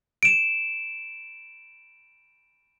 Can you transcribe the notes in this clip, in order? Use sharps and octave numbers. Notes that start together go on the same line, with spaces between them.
D7 E7